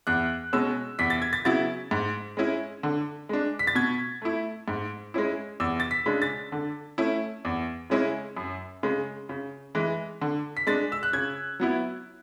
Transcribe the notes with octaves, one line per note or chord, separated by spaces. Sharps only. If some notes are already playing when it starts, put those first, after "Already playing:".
E2 F#6
B2 G#3 C#4 E6
E2 B6
A6
G#6
A6
C#3 F#3 B3 E4 A6
G#2
G#3 C#4 E4
D3
G#3 D4
B6
A6
B2 G#6
A3 E4
G#2
G#3 C#4 E4
E2 E6
A6
B6
C#3 G#3 D4
A6
D3
A3 C#4 E4
E2
C#3 G#3 C#4 E4
F#2
C#3 G#3
C#3
E3 G#3
D3
B6
G#3 D4 A6
E6
F#6
C#3 G#6
F#3 B3 E4